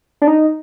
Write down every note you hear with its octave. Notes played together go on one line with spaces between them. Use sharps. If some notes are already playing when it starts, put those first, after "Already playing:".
D4
D#4